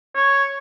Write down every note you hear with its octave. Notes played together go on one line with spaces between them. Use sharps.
C#5